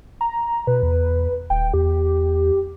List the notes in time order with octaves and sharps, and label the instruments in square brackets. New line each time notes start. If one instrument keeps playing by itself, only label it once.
[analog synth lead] A#5
[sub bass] B2 [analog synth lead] B4
[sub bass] E2
[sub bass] D#1 [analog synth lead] G5
[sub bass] E2 [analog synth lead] G4